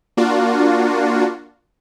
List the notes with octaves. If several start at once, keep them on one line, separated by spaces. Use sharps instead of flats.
A#3 D4 F4 F#4